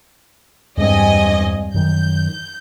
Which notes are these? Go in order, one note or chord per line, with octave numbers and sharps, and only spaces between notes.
E2 G2 G#3 C4 D#5 G#5
F#2 D#3 G6